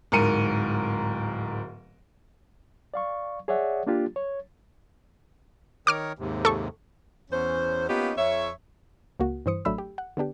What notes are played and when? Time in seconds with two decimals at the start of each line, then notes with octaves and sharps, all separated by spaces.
0.12 D1 G#2 A#4 C#7 D#7
2.94 D5 F5 C#6
3.48 G#4 C#5 D5 E5 F#5
3.87 A#3 D4 F4 G4
4.16 C#5
5.87 D#3 A#4 C#5 D6 F6 D7
6.19 D#2 G#2 C3
6.45 A4 C#6
7.31 E2 C#4 C5
7.88 A#3 B3 C#4 D#4 F4 G4
8.17 F2 C#5 E5
9.20 C#2 A#3 F#4
9.46 G2 E3 C5 D#6 C#7
9.65 A1 F#3 A3 D4 B5 E6
9.78 G4
9.98 F#5
10.17 D3 B3 D4 G4